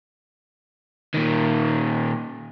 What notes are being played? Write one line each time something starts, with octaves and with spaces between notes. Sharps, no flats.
A#2 D#3